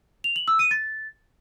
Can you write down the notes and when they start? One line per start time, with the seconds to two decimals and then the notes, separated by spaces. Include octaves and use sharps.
0.24 F7
0.36 F#7
0.48 E6
0.59 D#7
0.71 A6